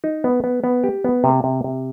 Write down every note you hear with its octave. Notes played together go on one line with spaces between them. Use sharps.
D#4
B3
B3
B3
G4
B3
C3
C3
C3